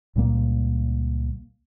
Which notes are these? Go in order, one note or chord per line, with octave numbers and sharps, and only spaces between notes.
C#2 A#2 G3 A#3